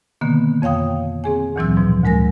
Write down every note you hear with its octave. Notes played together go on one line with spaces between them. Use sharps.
B2 D3 D#3 A#3 B3
F2 C#5 F5 G5 D#6
C4 G#4 G#5
D2 A#2 E3 F#3 C4 E6
G#2 B2 F3
D2 G#3 A#4 G#5 A#6